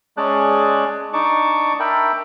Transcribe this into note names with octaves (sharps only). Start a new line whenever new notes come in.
G#3 C#4 G#4 D5 A5 F#6
D4 D#4 A5 C#6 D6
A#4 E5 G5 A5 B5